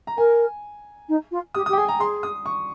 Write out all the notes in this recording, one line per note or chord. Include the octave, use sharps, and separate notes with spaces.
A#5
A#4 G#5
D#4
F4
G4 D#6
D#6
G4
G5
G#4 G#5
A#5
G#4 C6
D#6
C#6